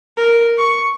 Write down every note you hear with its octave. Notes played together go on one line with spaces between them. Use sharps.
A#4
C#6